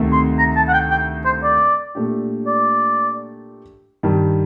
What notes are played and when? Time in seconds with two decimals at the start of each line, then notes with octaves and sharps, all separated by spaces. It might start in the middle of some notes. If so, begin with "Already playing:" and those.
Already playing: D2 C3 D#3 A3
0.12 C6
0.39 A#5
0.56 A5
0.68 F#5
0.73 G5
0.91 G5
1.25 C5
1.43 D5
1.95 A#2 A3 D4 G4
2.47 D5
4.03 G2 D#3 G3